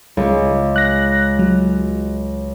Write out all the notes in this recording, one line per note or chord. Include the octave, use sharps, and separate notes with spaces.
C#2 G#3
F#6 A#6
F#3